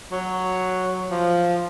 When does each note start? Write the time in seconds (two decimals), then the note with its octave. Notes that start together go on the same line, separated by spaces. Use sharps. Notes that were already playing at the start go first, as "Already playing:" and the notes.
0.12 F#3
1.11 F3